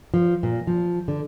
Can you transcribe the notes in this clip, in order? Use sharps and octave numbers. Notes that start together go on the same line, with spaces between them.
F3
A#2
F3
D3